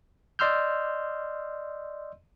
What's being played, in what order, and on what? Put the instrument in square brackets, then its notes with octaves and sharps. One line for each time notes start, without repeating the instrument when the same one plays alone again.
[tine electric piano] D5 D#5 C6 E6 F6 G6